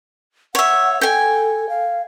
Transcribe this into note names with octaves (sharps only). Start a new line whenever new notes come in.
C#5 E5 F#5
A4 G5 G#5
F5